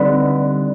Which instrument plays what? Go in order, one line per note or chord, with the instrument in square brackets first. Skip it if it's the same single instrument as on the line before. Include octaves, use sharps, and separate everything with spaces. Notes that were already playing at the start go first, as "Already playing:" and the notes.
Already playing: [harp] D3 G3 C4 D#4 A4 B4